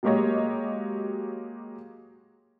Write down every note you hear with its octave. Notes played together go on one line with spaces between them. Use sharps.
F#3 G#3 A#3 G4 C#5 D#5